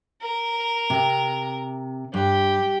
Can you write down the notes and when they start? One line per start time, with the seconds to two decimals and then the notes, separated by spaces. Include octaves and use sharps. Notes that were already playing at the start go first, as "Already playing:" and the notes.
0.22 A#4
0.90 C3
2.14 G2 G4